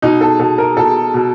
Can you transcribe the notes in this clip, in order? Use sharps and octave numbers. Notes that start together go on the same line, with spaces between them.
B2 D#4
A4
B2 A4
A#4
B2 A4
B2